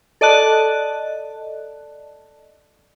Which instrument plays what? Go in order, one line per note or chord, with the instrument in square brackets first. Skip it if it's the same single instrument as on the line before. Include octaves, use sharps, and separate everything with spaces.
[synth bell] A4 D5 D#5 A5 F#6